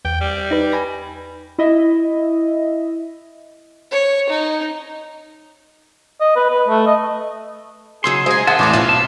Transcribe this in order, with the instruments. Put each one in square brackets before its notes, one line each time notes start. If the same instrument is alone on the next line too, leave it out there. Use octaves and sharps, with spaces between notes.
[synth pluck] E2 [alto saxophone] G5
[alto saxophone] G3
[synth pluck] D#4 B4
G#5 B5 A#6
[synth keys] E4 D#5 E5
[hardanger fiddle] C#5
D#4
[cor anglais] D#5
B4
B4
A3
D#5
[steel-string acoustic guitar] C#3 F#3 D#4 [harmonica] G#4 [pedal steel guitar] C6 E6
[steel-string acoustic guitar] G#3 G#5 [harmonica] D#4 G#4 D#5 [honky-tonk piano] C5 G#6
[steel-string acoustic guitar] D#3 [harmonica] E5 C6 [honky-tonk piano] F#5 [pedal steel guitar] A5 D#6
[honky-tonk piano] E2 A2 D6 [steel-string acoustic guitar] C#5 D5
[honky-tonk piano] B1 [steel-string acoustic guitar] C4 C#4 F4
[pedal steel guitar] A5